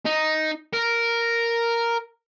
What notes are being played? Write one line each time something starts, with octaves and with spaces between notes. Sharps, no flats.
D#4
A#4